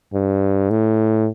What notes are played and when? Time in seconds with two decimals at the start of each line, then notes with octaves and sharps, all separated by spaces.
0.13 G2
0.70 A2